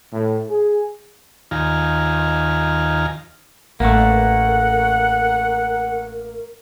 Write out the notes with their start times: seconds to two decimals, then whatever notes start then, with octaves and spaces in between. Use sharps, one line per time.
0.13 A2
0.48 G#4
1.51 D#2 D#3 F4 F5 G#5 A#5
3.80 A1 A3 A#3 A#4 F#5